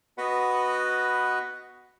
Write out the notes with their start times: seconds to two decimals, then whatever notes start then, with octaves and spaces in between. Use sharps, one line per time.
0.18 B3 F#4 B4 D#5 F#5 B5